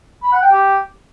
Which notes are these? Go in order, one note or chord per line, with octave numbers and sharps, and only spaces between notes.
B5
F#5
G5
G4